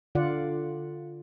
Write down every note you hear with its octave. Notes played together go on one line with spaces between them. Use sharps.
D3 F4 D5 F#5